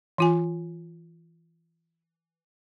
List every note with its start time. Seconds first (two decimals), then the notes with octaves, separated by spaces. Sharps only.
0.18 E3 F4 G#5